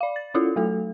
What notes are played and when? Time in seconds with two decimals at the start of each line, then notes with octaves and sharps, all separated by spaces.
0.01 D5 F5
0.16 A6
0.34 C#4 E4 F4 A4
0.56 F#3 A3 A4